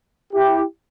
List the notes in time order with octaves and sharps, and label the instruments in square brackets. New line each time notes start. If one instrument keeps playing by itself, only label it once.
[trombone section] E4 G4